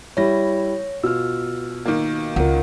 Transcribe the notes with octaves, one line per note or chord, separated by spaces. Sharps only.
G3 E4 C#5 A#6
B2 F4 E6 F6
D#3 A#3
C#2 A#4 F#5